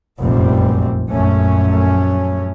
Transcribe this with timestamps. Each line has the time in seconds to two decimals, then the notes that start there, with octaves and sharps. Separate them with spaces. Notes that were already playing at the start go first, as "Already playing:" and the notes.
0.22 F1 A#1 F#2 G3 C4
1.11 A#1 F#2 A3 C#4